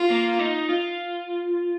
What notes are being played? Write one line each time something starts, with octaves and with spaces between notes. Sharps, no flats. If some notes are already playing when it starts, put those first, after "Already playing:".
Already playing: F4
A#3
D#4
F4